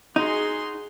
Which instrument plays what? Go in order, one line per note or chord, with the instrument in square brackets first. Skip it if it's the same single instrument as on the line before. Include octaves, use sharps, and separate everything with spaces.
[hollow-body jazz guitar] D#4 [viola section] F#4 G#4 C6